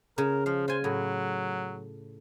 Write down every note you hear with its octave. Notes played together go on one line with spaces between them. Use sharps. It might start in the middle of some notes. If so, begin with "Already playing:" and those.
C#3 A#4
F3 F5
F4 C5 G#5
A2 F#3